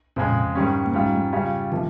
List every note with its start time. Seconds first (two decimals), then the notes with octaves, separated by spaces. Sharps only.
0.16 F2 A#2 C#3 G#3
0.55 G#2 D#3 G3 C#4
0.86 A#3
0.94 G#2 G3 G#3 C#4 F4
1.33 C#3 G3 C#4 F4
1.71 C3 D#3 F3 A#3